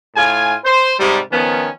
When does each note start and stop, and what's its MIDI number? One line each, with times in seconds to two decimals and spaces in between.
0.16 0.54 45
0.16 0.54 65
0.16 0.54 80
0.64 0.93 72
0.99 1.18 44
0.99 1.18 48
0.99 1.18 55
1.31 1.67 51
1.31 1.67 53
1.31 1.67 59
1.31 1.67 61